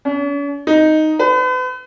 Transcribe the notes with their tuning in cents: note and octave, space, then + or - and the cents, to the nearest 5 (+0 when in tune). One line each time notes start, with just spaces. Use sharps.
C#4 +45
D#4 +0
B4 +40